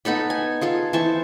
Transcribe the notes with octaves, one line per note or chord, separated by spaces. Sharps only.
B3 D#4 A4 B5
G#5
F4 G#4 A4
E3 C5 A5 C#6